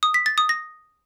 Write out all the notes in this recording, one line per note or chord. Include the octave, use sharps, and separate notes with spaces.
D#6
B6
A6
D#6
A#6